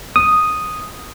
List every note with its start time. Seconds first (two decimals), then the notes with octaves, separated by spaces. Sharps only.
0.16 D#6